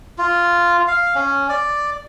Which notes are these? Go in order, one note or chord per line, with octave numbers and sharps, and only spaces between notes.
F4
F5
C#4
D5